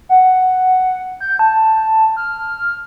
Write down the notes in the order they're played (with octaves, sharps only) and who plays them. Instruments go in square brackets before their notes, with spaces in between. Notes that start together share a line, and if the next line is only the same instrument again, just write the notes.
[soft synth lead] F#5
G6
A5
F6